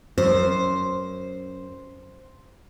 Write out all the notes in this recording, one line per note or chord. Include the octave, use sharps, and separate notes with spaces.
F#2 C5